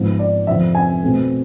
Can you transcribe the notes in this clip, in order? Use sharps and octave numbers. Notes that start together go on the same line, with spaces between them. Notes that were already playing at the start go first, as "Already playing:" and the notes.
Already playing: G#2 F3 B3
D5
F2 C3 F3 E5
G#5
B2 A3 C4